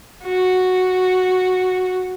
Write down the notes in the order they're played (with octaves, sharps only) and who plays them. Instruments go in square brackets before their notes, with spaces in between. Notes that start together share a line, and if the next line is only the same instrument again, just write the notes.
[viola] F#4